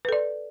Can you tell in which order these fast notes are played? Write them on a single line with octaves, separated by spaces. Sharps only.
B4 A4 D5